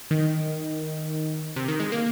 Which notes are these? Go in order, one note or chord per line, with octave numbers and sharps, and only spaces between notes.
D#3
C3
D#3
G#3
A#3